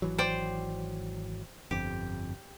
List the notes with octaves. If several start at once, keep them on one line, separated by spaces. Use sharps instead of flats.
G#1 E3 F#3
C5 D5 G5
G1 F2 G4